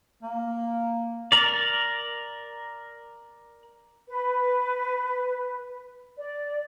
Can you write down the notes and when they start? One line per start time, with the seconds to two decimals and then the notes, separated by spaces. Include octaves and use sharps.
0.23 A#3
1.32 A#4 D5
4.07 B4
6.17 D5